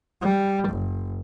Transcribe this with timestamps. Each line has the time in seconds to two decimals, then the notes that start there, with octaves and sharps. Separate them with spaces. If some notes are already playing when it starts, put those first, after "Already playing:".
0.21 G3
0.69 F#1